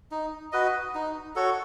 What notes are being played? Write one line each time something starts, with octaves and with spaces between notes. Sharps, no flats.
D#4
F#4 B4 D#5
D#4
F#4 A4 C#5